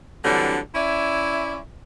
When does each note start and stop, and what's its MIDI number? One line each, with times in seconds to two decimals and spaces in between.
0.24 0.58 50
0.24 0.58 52
0.24 0.58 54
0.24 0.58 55
0.24 0.58 60
0.24 0.58 62
0.75 1.57 61
0.75 1.57 64
0.75 1.57 74
0.75 1.57 76